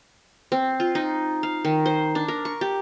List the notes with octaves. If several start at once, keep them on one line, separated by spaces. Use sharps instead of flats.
C4
F4
D#4
F5
D#3
C5
D4
A#4
C#6
G4